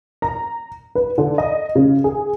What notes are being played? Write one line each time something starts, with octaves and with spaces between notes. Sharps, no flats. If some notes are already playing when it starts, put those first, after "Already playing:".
A#5
B4
D3
D#5
C#3
G#4